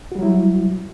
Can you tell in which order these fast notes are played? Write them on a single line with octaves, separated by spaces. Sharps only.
F#4 G3 F#3 E4